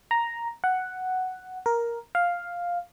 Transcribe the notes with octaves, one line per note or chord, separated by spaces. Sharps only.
A#5
F#5
A#4
F5